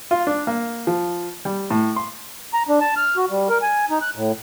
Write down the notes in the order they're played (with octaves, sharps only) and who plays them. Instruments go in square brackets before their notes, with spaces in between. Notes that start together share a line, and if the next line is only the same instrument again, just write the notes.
[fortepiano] F4
D4
A#3
F3
G3
A2
C6
[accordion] A#5
D4
A5
F6
F#4
G3
A#4
G#5
D#4
F#6
A2